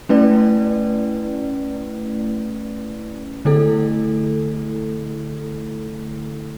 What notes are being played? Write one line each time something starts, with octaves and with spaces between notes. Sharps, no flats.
A3 C#4 E4 B4 D5
D3 A3 E4 A4